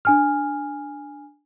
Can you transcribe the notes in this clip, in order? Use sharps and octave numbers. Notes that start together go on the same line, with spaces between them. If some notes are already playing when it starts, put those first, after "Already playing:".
D4 G#5 F6